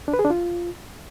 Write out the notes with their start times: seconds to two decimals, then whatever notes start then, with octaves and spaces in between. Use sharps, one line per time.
0.08 D4
0.14 B4
0.19 G#4
0.25 D4
0.30 F4